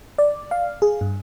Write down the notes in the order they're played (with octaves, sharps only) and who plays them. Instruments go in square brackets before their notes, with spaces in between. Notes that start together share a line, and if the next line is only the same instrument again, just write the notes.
[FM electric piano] D5
F5
G#4
G2